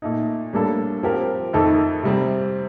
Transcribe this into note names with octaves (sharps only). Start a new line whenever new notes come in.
A#2 A3 D#4
A2 G3 A#3 D4 A4
F3 C4 G4 A#4
F2 D#3 A3 D#4 A4
C3 G3 C4